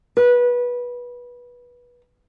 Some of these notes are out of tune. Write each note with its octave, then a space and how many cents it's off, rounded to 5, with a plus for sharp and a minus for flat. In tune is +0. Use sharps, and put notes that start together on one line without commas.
B4 -20